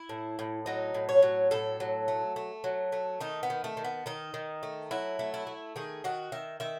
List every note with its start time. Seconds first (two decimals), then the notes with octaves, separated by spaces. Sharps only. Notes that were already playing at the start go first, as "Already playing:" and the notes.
Already playing: E4
0.09 A2
0.39 A2
0.66 F#3 D#4
0.94 A2
1.09 C#5
1.22 F#3
1.51 A2 A4
1.80 F#3
2.08 A3
2.36 A3
2.64 F#3
2.92 A3
3.21 D#3 D#4
3.43 B3
3.50 D#3
3.64 A3
3.77 D#3
3.84 B3
4.06 D#3 D#4
4.34 D#3
4.63 A3
4.91 F#3 E4
5.19 A3
5.34 E4
5.47 A3
5.76 D#3 G#4
6.04 D#3 F#4
6.32 D#3 E5
6.60 D#3 E5